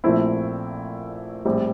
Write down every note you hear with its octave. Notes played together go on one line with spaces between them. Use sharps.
A#1 A#2 F3 A3 C4 E4
A#1 A2 G3 C4